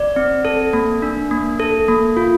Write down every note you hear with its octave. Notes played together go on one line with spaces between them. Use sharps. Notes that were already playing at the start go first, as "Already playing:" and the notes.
Already playing: D5
C4
A4
A#3
D4
A#3
A4
A#3
F4